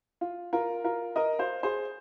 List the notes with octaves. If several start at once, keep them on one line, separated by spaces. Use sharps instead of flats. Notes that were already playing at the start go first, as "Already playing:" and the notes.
F4
F4 A#4
F4 A#4
A#4 D#5
C5 F5
G#4 C5